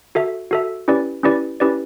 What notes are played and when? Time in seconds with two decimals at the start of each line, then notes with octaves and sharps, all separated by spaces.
0.15 F#4 A4 E5
0.51 F#4 A4 E5
0.88 C#4 E4 G4 B4 D5
1.23 C#4 E4 G4 B4 D5
1.60 C#4 E4 G4 B4 D5